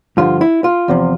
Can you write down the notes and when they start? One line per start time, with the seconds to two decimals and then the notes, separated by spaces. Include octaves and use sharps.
0.17 G2 D3 F3 F4
0.41 E4
0.64 F4
0.88 E2 C3 F3